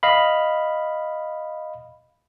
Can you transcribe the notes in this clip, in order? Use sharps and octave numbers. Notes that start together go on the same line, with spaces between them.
D#5 F5 B5